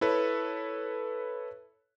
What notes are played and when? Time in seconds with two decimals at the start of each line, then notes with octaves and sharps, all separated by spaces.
0.01 E4 A4 B4 C#5